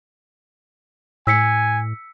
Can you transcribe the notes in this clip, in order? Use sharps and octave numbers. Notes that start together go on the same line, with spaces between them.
A2 G#5 E6 B6 C#7